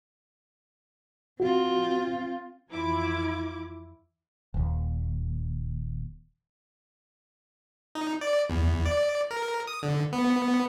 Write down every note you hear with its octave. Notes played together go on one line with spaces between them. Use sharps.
C4 F4 F#4
F2 E3 E4 F4 D6 G#6
D#1 D#2
D#4
D5
E2
D5
A#4
D#6
D3
B3